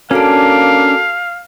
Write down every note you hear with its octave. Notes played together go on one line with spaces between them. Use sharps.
A#3 C#4 D4 F#4 A4 F5 A5